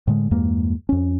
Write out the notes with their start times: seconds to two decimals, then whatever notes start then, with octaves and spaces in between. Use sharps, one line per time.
0.07 A2 D3 G#3
0.31 E2 G2 G#3 A#3
0.89 F2 C#4